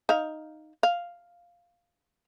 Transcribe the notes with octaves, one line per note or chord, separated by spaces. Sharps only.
D#4 F5
F5